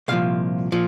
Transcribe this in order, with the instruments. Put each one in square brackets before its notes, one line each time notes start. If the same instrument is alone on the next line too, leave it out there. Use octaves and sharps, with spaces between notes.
[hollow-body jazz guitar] C2 A#2 F3 F5
A#2 F3